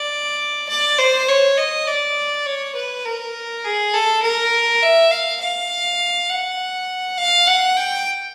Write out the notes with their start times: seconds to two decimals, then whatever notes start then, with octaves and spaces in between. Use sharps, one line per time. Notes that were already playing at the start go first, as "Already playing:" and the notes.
Already playing: D5
0.69 D5
0.99 C5
1.28 C#5
1.58 D#5
1.87 D5
2.46 C#5
2.76 B4
3.05 A#4
3.64 G#4
3.94 A4
4.23 A#4
4.83 E5
5.11 F5
5.41 F5
6.29 F#5
7.18 F5
7.47 F#5
7.77 G5